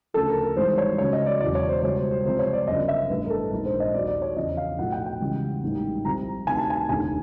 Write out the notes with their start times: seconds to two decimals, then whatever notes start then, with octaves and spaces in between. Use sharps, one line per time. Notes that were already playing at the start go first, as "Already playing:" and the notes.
0.14 D2 C#3 F3 A4
0.29 A#4
0.42 A#4
0.57 G#1 G#2 E3 G3 C5
0.78 C#5
0.98 C#2 C#3 F#3 C#5
1.13 D#5
1.26 D5
1.40 E1 E2 C#3 F#3 D5
1.55 C#5
1.68 C5
1.83 C#2 B2 G3 C#5
1.97 C5
2.11 C5
2.25 C#2 C3 F3 C5
2.39 C#5
2.53 D5
2.67 G1 F#2 C#3 D#5
2.88 E5
3.10 A1 G2 D3 B4
3.26 A#4
3.30 A4
3.52 A#1 G#2 D#3 A#4
3.66 C5
3.80 D#5
3.94 D#2 D#3 F#3 D5
4.08 D5
4.22 C#5
4.36 E2 C#3 F3 D#5
4.57 F5
4.78 B1 A2 F3 F#5
4.92 G5
5.06 G5
5.20 C#2 C#3 E3 G3
5.63 A1 G#2 D#3 G3
6.04 C2 C3 F3 A#5
6.46 D2 C3 D#3 G#5
6.58 A5
6.70 G#5
6.89 F1 D#2 D3 G#5